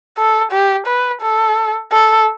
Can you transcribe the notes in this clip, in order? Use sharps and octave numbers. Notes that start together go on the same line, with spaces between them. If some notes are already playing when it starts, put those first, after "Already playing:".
A4
G4
B4
A4
A4